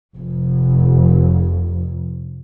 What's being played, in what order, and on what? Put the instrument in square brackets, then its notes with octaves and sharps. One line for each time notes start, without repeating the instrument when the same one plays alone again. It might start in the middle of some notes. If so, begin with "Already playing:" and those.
[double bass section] F1 F2